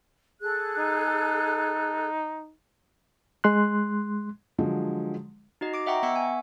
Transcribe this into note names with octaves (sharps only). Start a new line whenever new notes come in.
G#4 A4 F#6
D#4
G#3 C6 F#6
D3 F3 F#3 G#3
D#4 F#4 D#5
D6 D7
D#5 E5 F#5 G5 A#5 C#6
B3 E5 F#5 C#6 E6 C#7
G#5